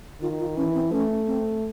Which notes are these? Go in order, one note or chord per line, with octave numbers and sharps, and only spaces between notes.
D#3 F4
F4
E3 C#4
C4
A3 C#4
C4